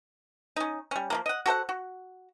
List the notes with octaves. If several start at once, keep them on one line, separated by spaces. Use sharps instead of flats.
C#4 D#4
G3 C#4
F3 G#3 A#3
D#5 F#5
F#4 A4 C5 F#5
F#4